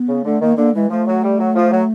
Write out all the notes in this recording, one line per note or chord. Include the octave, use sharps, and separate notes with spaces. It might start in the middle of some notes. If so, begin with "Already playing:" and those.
Already playing: B3
C#3
D3 A3
D#3 A#3
D3 A#3
E3 G#3
F3 A3
F#3
G3
F#3
F3
F#3